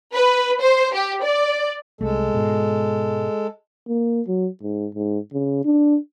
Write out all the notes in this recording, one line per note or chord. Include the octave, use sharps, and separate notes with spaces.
B4
C5
G4
D5
C2 G#3 A3 A4
G#2 B2
A#3
F#3
G#2
G#2
C#3
D4